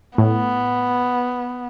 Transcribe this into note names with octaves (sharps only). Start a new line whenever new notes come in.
A2 B3